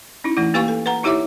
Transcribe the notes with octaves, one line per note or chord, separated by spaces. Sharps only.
C#4 D#4 E4
E3 A3 E4
A#3 G4 B4 F5 G#5 C#6
A4
B4 F#5 A#5
D#4 E4 G4 C#5 E5 D6